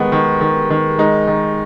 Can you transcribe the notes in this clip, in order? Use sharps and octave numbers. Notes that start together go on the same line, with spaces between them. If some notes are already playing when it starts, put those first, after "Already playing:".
Already playing: D#3 G#3 B3
D#3
D#3
D#3
G#3 D#4
D#3